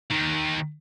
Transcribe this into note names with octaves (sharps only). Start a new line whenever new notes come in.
D#2 D#3